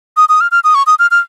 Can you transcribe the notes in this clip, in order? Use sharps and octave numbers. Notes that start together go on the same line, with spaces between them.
D#6
D#6
F6
F6
D#6
C#6
D#6
F6
F6